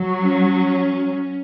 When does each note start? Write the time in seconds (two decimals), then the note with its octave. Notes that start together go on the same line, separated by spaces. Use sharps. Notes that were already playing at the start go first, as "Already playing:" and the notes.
Already playing: F#3
0.21 C#4